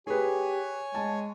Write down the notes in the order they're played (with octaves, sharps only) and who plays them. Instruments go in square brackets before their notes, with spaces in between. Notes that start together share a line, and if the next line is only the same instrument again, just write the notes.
[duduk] G4 [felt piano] G#4 B4 [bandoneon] C#5 G#5
[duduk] G#3 [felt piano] A5